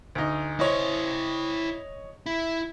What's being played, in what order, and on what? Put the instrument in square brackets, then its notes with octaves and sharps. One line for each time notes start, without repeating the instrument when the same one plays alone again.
[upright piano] D2 D#4
[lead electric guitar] E4 C5 [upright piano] C#5 D#5
[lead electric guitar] E4